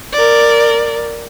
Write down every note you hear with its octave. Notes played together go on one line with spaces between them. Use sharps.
A#4 D5